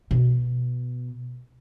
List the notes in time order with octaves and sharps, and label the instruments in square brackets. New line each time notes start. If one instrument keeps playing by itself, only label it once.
[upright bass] B2